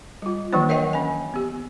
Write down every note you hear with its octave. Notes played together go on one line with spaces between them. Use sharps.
G3 F4
D#3 E3 F#3 A#3 D4 C5
A#4 C#5 D#5 E5 F#5 G5
C#4 G#5
B3 G4